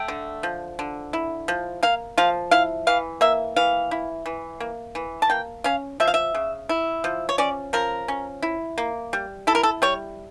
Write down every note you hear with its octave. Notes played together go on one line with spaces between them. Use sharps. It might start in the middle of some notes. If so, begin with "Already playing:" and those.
Already playing: A3 G5
D3
F3
D3
E4
F3
A#3 F5
F3 F5
E4 F5
E3 F5
A#3 E5
E3 F5
E4
E3
A#3
E3
A5
A#3 G5
C#4 F5
F3 E5
F5
E5
C#3
E4
F3
C#5
C#4 D5
F3 A#4
C#4
E4
A#3
G3
E4 A4
A#4
A4
G3 C#5